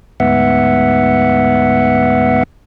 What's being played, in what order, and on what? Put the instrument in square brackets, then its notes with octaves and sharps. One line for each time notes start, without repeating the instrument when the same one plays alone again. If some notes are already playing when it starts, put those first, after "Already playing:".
[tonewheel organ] D2 G#2 B3 E5 F#5